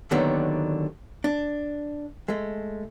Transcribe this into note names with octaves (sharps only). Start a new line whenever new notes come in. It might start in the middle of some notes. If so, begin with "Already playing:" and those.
D#2 A#2 D3 D#3 F#3 B3
D4
G#3 A3